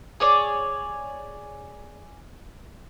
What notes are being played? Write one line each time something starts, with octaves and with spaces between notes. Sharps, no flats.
G#4 C#5 D5